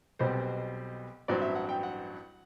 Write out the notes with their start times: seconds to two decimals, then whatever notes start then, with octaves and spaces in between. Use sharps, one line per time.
0.19 B1 B2 G3 C4 C5
1.28 A1 G2 F#3 C4 D5
1.42 E5
1.55 F#5
1.69 G5
1.83 F#5